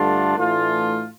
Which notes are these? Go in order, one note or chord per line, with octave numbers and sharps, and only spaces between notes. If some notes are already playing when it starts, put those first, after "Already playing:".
Already playing: G2 D3 A3 D4 F4
A2 E3 A3 D4 F4